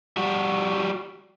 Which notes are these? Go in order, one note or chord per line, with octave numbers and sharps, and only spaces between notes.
G3 F#4